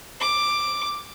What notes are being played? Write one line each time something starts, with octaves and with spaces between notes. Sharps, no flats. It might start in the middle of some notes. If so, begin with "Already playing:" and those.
D6